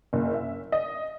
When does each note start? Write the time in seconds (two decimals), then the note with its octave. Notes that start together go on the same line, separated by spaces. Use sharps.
0.13 F#1
0.34 E5
0.72 D#5